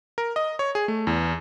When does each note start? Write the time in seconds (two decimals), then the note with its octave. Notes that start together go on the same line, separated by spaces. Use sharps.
0.18 A#4
0.36 D#5
0.59 C#5
0.75 G#4
0.88 A3
1.07 E2